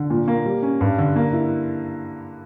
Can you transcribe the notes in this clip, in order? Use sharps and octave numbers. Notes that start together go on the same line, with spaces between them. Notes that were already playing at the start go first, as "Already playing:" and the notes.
Already playing: D3
A#2
A#3
G3
C#4
G2
D3
A#3
E4